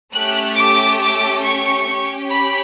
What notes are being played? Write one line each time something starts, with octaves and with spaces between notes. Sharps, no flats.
A3 C#4 G4 F#6
D6
D6
C#6
C#4 G4
B5